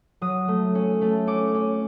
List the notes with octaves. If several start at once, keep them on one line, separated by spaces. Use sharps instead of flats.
F#3 D#6
A3
C#4
A3
C#4 D6
C#4